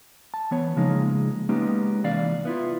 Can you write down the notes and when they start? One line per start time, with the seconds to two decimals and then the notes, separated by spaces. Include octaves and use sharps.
0.34 A5
0.51 E3 B3 C#5
0.76 C#3 F3 G#3 A#3 D#4
1.49 G#3 A#3 B3 C#4 D#4 G4
2.04 C2 E3 D5 F5
2.45 B3 E4 F4